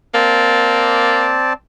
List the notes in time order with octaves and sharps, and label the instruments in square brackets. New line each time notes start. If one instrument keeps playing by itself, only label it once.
[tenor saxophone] A#3 [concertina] C4 D5 A5